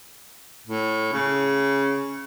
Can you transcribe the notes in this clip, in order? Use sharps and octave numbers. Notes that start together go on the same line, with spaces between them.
A2
C#3